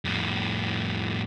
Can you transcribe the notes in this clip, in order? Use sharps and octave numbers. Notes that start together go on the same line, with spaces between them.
F2 A2